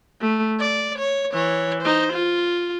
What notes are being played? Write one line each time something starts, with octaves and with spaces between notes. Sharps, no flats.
A3
D5
C#5
E3 C#5
D#4 C5
F4